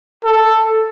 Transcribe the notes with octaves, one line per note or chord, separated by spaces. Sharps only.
A4